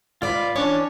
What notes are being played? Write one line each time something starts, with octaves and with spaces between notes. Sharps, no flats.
G#2 F4 B4 D5
E3 C#4 D4 C#5 D6